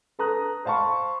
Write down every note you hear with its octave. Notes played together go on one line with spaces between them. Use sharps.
A4 B4 A#5 D#6 F#6
C5 F5 A5 B5 C#6